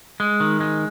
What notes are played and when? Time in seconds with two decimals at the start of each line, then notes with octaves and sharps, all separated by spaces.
0.20 G#3
0.40 D#3
0.60 G#3